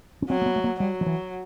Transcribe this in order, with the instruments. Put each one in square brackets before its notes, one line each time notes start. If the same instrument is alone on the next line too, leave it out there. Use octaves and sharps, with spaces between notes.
[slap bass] C#4
[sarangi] F#3 [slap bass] C4
[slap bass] A#3
B3
A3
A#3
[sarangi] F#3 [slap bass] G3
[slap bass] F3
E3